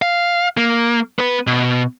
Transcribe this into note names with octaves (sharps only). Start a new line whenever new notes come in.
F5
A#3
B3 B4
B2